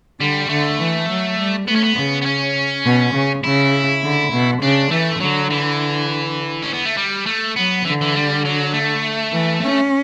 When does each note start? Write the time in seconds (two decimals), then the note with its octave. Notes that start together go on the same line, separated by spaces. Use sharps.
0.20 D3 G3
0.49 D3 A3
0.79 E3
1.09 F#3
1.38 G3
1.68 A3 B3
1.76 C#4
1.84 B3
1.97 C#3
2.22 B3
2.26 C#4
2.85 B2
3.14 C#3
3.44 C#3 E4
4.03 D3
4.33 B2
4.62 C#3 D4
4.91 E3 A3
5.20 D3 F#3
5.51 E3
6.63 C#4
6.74 B3
6.86 A3
6.97 G3
7.27 A3
7.56 F#3 B3
7.85 D3 E3
8.01 E3
8.15 G3
8.45 F#3
8.73 A3
9.32 E3
9.62 C#4